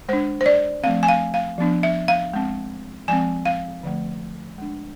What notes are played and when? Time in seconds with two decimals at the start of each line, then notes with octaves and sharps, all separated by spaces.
0.09 G#3 D4 C5
0.41 C5
0.46 D5
0.83 F3 A3 C4 F5
1.03 G#5
1.08 F5
1.34 F5
1.58 F3 B3 D4
1.83 E5
2.08 F5
2.33 G#3 C4
3.08 F3 G#3 C4 G#5
3.46 F5
3.83 D3 F3 A3
4.58 G#3 D4